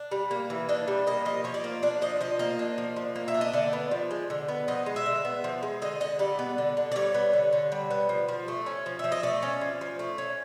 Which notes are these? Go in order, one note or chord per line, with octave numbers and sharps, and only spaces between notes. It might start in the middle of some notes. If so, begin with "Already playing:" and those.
Already playing: D4
G3
A#3
E3
D4 D#5
G3
A#3 D#5
F3 D#5
F3 C#5
D5
A#3
D4 D5
F3 D#5
F3 D#5
A#3 D#5
D4
F3
F3
A#3
E5
D4
D#5
D3 D5
B3
F3
G#3
D3
B3
F3 D#5
G#3
E5
D3
B3
F3
G#3
D3 D#5
D3 D#5
G3 D5
B3
D3
D3
D5
G3 C#5
B3
D3
D3
G3
B3
F3
F3
A3
C#4
F3
F3 E5
D#5
A3 D5
C#4
F3
F3
A3
C#4